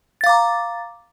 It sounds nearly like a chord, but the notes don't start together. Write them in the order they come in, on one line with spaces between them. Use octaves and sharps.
A6 F5 D6 A#5